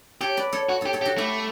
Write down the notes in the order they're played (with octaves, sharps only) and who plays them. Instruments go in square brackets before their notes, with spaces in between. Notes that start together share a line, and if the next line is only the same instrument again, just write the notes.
[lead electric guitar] G4 [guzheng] A4 C#5
[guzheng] B4 D5
A4 C#5
[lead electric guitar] F#4
[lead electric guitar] G4 [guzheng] A4 C#5
[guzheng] A4 C#5
[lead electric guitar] G4
[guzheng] F#4 A4
[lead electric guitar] A3 [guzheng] E4 G4